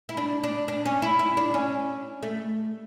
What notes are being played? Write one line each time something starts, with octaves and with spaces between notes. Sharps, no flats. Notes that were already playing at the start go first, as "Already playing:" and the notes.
E4
D4
D4
D4
C#4
E4
E4
D4
C#4
A3